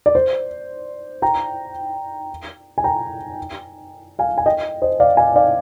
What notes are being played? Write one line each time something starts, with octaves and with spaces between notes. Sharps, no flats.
D5
C5
G5 A#5
G#5
G5 A#5
F5 G#5
G#5
D#5 G5
C5 D#5
D5 F5
F5 G#5
D5 F5